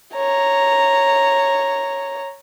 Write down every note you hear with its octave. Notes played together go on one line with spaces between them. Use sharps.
C#5 A#5